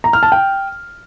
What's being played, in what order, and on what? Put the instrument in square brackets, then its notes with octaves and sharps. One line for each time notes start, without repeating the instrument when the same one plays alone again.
[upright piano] A#5
F6
A5
G5